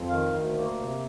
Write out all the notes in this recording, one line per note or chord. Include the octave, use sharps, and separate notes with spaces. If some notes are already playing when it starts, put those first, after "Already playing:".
Already playing: F2
D#3 F5
D2
A#3
C3